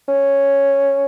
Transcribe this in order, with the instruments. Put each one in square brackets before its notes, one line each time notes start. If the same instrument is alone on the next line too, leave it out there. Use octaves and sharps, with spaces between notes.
[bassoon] C#4